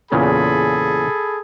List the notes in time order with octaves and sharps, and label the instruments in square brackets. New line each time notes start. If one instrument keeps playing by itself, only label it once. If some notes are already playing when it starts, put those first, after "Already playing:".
[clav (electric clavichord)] E2 A#2 C#3 [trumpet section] G#4 A4 B5